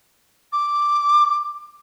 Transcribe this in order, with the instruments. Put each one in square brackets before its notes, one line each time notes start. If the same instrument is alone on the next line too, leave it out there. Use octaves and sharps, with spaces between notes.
[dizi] D6